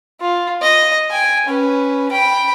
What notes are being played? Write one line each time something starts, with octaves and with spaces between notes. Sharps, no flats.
F4
D#5
G5 G#5
C#4 B4
G5 B5